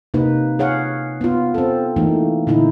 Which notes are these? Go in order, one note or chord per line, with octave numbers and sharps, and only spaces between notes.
C3 A#3 D#4 B4
G#4 C#5 F5 F#5
B3 F4
C4 A4
E3 A3 A#3 D#4
A#2 D3 D#4 E4